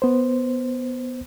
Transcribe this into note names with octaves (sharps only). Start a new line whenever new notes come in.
B3 C5